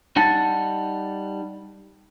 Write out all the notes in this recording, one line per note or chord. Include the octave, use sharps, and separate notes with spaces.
G3 D#4 F#5 A5